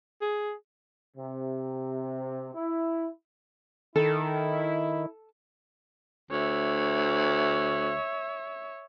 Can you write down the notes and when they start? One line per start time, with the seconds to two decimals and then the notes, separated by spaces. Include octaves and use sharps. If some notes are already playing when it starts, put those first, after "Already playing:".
0.21 G#4
1.17 C3
2.54 E4
3.96 D#3 E4 A4
6.31 D2 C#5 E5